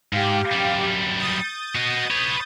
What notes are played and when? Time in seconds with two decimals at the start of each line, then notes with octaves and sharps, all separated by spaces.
0.13 G#2 G4 F5
0.52 F#2 G3
1.18 D#6 G6 A6
1.75 F#4 D#5
2.10 B4 C#5